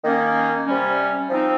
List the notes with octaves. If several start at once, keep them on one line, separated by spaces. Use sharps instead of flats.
D#3 A#3 C#4
C3 G3 C#4
F3 C4 D#4